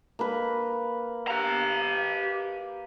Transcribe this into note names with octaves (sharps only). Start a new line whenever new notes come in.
A#3 B4
G4 A#5